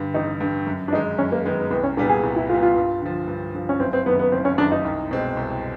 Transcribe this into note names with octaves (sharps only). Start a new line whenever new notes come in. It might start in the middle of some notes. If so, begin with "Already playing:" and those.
Already playing: G2 D3
A1 D#4
G2 D3
F#2
D4
D#3 G#3 D#4
F#2 C#4
A#3
D#3 G#3 B3
B3
C2 B3
C#4
A#2 G3 B3 D4
G#4
C2
E4
A#2 G3 B3 F4
F4
G2
D3 F3
G2
D3 F3
C#4
F#1 C4
C4
F#2 D#3 B3
B3
F#1 C4
C#4
F#2 D#3 D4
D#4
C2
B2 G#3 C4
C2